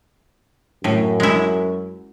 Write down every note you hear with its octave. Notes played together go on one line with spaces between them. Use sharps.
F#2 A2
G#3 E4